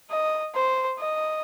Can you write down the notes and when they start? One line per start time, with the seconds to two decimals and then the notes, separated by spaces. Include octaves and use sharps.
0.10 D#5
0.55 C5
0.99 D#5